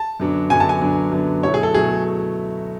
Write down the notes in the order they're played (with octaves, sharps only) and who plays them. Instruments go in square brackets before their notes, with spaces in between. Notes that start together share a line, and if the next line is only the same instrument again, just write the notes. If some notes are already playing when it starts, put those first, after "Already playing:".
Already playing: [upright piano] A5
[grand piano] F#2 D3 F#3 B3 D4
[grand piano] F#2 D3 F#3 B3 D4 [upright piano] G#5
[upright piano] A5
G#5
[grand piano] F#2 D3 F#3 B3 D4
F#2 D3 F#3 B3 D4
[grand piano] B2 F#3 A3 E4 [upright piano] C#5
[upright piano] G#4
A4
[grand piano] B2 F#3 A3 E4 [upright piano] G#4